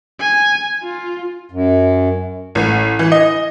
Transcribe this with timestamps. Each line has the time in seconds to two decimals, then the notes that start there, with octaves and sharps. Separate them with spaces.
0.20 G#5
0.84 F4
1.51 F#2
2.55 A1
2.99 E3
3.12 D#5